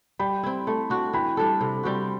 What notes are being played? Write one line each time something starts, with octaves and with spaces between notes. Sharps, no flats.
G3 G5 B5
C4 E4
A3
D4 F#4
E3 G5 B5
G3 D4 A4
C3
G3 C4 F#4